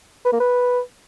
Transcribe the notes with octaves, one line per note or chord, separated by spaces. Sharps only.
B4
A#3
B4